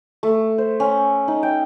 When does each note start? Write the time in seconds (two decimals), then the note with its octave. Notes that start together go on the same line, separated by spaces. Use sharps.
0.23 A3
0.58 C5
0.80 C#4
1.28 D#4
1.43 G5